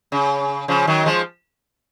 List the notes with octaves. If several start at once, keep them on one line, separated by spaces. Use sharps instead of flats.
C#3
C#3 F3
D#3 F#3
F3 G#3